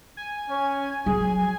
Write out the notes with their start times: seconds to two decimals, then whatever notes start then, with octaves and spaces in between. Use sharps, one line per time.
0.17 G#5
0.49 C#4
1.06 F#3 G#4